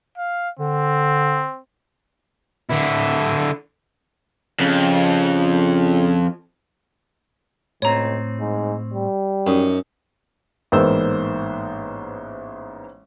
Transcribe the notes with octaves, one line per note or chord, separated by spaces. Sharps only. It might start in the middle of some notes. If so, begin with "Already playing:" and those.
F5
D3 C4
D3 E4
F2 C#3
C#2 A2 C4 C#5 A#5
G#2
G3
F#2 D#4
A1 G#2 A#3 B3 C5 E6